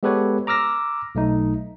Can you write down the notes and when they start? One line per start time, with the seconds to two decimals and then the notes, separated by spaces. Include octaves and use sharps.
0.03 G#3 B3 G4 A4 B4 C#5
0.47 A#5 D6 E6 F6 A#6
1.15 B1 A3 D#4